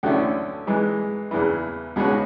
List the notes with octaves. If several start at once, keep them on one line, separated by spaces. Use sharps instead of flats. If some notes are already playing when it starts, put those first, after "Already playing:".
D2 D3 F#3 C#4 E4
G#2 E3 G#3
E2 C#3 E3
C#2 B2 G#3 C#4 F#4